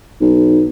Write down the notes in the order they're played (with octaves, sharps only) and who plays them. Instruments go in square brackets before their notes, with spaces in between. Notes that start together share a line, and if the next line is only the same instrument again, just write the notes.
[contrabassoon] B1